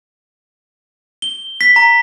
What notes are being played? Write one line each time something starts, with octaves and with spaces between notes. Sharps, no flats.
G7
B6
A#5